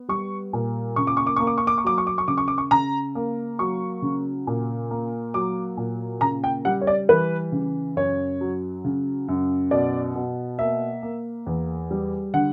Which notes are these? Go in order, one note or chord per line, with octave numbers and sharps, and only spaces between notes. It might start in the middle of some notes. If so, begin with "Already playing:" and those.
Already playing: B3
G3 C#6
A#2
C#3 C#6
D6
C#6
D6
A#3 C#6
D6
C#6
D6
C#6
F#3 D6
C#6
D6
C#6
C#3 D6
C#6
D6
C#6
C#3 A#5
A#3
F#3 C#6
C#3
A#2
A#3
F#3 D6
A#2
C#3 A#5
G5
G3 F#5
C#5
D5
E3 B4
C#3
F#2 C#5
F#3
C#3
F#2
B2 D5
B2
A#3 E5
A#3
E2
G3
D3 F#5